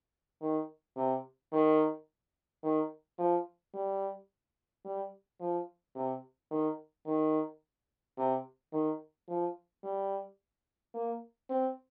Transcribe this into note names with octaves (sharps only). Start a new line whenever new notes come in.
D#3
C3
D#3
D#3
F3
G3
G3
F3
C3
D#3
D#3
C3
D#3
F3
G3
A#3
C4